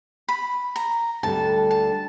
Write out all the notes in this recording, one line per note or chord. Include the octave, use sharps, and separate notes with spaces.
B5
A#5
D2 D3 G3 A5
A5